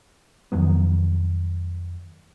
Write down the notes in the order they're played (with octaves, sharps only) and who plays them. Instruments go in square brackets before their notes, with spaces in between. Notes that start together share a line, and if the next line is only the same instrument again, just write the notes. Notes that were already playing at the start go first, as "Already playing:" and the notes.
[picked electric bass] F2 D#3 F#3 B3